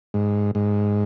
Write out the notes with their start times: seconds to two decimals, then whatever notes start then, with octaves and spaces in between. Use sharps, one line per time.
0.14 G#2
0.55 G#2